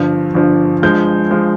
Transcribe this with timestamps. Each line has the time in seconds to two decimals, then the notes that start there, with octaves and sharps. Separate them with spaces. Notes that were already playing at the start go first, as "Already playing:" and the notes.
Already playing: G1 G2 F3
0.34 G1 G2 F3
0.82 G2 F3 G#3 G6
1.31 F3 G#3